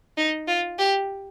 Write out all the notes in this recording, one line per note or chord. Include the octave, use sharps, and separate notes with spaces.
D#4
F4
G4